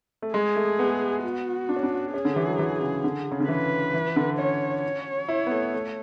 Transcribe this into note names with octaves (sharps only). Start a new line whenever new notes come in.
A3
G#3 G#4
A3
B3
F#4
D4
C#4
D4
C#4 G#4
D3
E3
F#3
E3
C#3
D3
C#3
D3
E3 B4
E3
D3
C#4 C#5
C#5
E4
B3
A3
A3